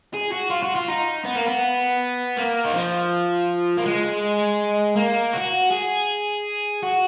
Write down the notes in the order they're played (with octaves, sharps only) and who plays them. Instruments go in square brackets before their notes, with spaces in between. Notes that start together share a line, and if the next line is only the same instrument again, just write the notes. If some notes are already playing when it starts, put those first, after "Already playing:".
[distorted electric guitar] G#4
F#4
F4
F#4
F4
D#4
B3
A#3
B3
A#3
D#3
F3
A#3
G#3
A#3
F#4
G#4
F#4